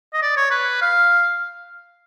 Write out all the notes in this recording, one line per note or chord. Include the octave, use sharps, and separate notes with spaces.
D#5
D5
C#5
B4
F5